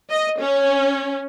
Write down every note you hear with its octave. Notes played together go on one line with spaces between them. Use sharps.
D#5
C#4